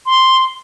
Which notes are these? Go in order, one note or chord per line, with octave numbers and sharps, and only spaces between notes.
C6